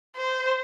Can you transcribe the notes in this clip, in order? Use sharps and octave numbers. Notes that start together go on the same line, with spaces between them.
C5